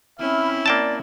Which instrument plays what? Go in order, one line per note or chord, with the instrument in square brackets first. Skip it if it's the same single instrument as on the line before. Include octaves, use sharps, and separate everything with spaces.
[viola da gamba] C4 C#4 E4 [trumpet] E5 [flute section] B5 F6
[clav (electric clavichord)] A#3 G5 A5 [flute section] D5